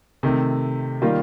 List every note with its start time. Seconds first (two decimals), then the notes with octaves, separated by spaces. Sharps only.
0.23 C3 D#3 A3
1.02 D#3 G3 A#3 F4